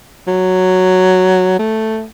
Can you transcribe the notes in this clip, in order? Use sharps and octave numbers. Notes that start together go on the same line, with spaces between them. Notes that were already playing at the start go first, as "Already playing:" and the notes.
F#3
A3